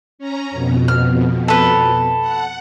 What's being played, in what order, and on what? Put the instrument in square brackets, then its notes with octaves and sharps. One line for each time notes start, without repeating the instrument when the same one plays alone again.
[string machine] C#4 A#5
F2 B2
[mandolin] F6
A4 B4
[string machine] F#5